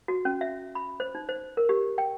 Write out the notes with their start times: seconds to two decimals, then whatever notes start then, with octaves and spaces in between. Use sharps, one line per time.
0.08 F#4
0.25 C#4
0.41 E5
0.75 B5
1.00 C5
1.15 D#4
1.29 C5
1.57 A#4
1.69 G4
1.98 G5